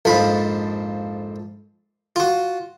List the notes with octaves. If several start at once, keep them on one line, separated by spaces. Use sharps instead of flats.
A#1 F2 G#2 F3 B5
F4 F#4